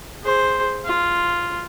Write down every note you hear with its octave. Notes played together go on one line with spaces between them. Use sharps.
G#4 C5
F4